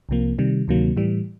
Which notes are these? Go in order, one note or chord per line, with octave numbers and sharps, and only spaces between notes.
C2 C3 F3 A#3
C3 D#3 G3
D2 C3 D#3 F#3 A#3
A2 E3 G3